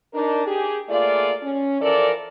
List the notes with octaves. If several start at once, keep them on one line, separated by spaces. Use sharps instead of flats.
D4 D#4 A#4
G4 G#4
A3 A#3 F4 G#4 D5
C#4
E3 F3 A4 A#4 D5